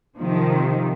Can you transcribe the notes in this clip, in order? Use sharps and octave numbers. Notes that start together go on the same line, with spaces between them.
C3 D#3 F3